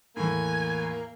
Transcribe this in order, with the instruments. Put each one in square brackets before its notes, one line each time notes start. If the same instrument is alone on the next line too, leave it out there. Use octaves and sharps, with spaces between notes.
[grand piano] E2 A2 [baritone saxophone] A#3 [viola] G#5